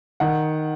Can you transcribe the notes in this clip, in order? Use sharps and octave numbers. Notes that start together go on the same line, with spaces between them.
D#3 F#5